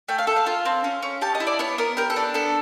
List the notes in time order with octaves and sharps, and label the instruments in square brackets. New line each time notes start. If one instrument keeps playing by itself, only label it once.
[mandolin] A3 G5
F5
A4 E5
F5
F4
C4
C#4
C#4
G4 A5
D#5
E4
D5
B3 C#5
B3 A#4
G4 A#4
A4
D4
B3 A4